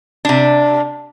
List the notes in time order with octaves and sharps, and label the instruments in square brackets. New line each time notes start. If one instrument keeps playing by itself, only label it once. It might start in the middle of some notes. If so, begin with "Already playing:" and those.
[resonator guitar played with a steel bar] C3 D4